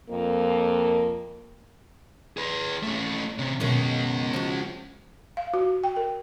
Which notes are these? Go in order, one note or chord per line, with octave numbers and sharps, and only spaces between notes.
F2 A#3
G#4 B4
A3 C#4
C3 C#4
F#2 B2 D#3 G#3 C#4
F3 F#4
F5
F#4
G5
A#4